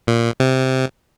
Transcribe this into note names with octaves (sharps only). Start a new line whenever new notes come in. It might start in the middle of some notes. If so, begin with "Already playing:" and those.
A#2
C3